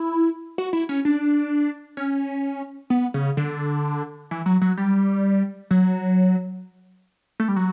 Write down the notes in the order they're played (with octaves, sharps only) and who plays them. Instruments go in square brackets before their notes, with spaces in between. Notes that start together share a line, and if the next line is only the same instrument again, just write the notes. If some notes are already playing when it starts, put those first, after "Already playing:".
Already playing: [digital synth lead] E4
F#4
E4
C#4
D4
C#4
B3
C#3
D3
E3
F#3
F#3
G3
F#3
A3
G3
F#3